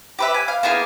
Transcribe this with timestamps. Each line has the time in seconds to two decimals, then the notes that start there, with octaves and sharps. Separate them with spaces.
0.19 G4 B4 E5
0.34 G#5
0.48 F5
0.63 A#3 B3 E4 G#4